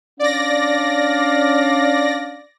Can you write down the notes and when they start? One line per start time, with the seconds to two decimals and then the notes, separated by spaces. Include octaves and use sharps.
0.19 C#4 D4 D5 F5 A#6